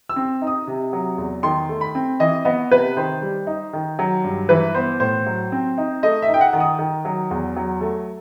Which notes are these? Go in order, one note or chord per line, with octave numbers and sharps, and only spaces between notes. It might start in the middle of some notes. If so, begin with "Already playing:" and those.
E6
C4
D#4
D#6
C3
F#3
E2
D#3 C6
A3
B5
C4
E3 D#5
B3 D#5
C3 B4
D#3 C5
G3
D#4
D#3
F#3
G2
E3 B4
B3 C5
A2 C5
F#3
C4
D#4
A3 D#5
E5
D#4
G5
F#5
D#3
D#6
D#3
F#3
E2
F#3
A3